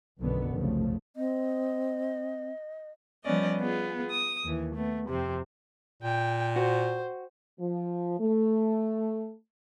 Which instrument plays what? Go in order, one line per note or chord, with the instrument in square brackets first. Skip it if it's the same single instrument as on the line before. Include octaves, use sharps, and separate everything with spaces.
[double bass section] B1 F#2 B2 D3 D#3 B3
F1 B1 F#2 C#3 F3 A3
[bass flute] C4 [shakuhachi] D#5
[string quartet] F3 G3 B3 C#4 D5 D#5
B3 F4 G#4
D#6
D#2 E3
A3 B3
F2 C3 C4
[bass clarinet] A#2 [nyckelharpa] G5
[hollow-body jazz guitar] F#4 [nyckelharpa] C5
[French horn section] F3
A3